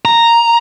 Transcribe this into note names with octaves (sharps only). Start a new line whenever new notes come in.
A#5